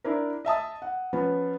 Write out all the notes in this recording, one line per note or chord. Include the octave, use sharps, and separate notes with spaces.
D4 E4 A#4
D#5 E5 A5 D#6
F#5
F3 B3 C#4